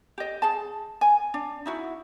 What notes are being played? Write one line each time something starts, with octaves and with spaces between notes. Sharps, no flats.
G4 D#5
G#4 A5
G#5
D4
D#4 E4 F#4